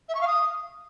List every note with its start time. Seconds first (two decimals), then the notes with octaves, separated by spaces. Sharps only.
0.08 E5
0.15 C#6
0.21 F5
0.27 D#6